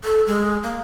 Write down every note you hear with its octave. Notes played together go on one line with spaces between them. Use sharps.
A4
G#3
A#3